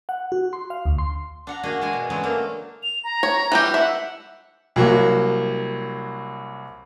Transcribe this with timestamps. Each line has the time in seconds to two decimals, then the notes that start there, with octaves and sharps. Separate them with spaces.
0.09 F#5
0.32 F#4
0.53 C6
0.70 F5
0.86 D2
0.98 C6
1.47 D4 F#5 A#5
1.63 A#3 D4 F#4 G#4 D#5
1.82 G#3 D4 G#5
1.93 B2
2.10 C#3 E3 F#3 G#3 A3 B3
2.23 A3 A#3 D4
2.83 F7
3.04 A#5
3.23 C#5
3.52 E3 G3 G4
3.74 E5 F#5
4.76 C2 F#3 A#3